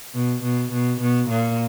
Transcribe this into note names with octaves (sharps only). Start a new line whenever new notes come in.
B2
B2
B2
B2
A#2